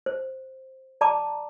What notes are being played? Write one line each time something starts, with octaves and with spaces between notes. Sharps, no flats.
C5
D5 A5 A#5 D6